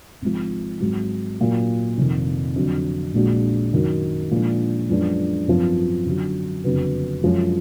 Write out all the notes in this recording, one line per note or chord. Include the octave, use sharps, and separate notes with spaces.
G#1 G#2 F3
G#1 G#2 F#3
A#2 F#3 A#3
F1 F2 D#3
F2 D3 F#3
A#1 A#2 G#3 D4 F#4
F#2 D#3 F#3
A#2 F3 G#3 D4
F#2 F3 G#3 B3 D4
G#1 F#2 F3 B3
F#2 D3 F#3
F#1 F2 D3 F#3 B3
F#2 F3 G#3